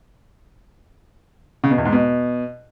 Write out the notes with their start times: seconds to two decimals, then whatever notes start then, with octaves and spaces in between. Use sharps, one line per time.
1.64 C#3
1.71 B2
1.78 E2
1.85 G#2
1.93 B2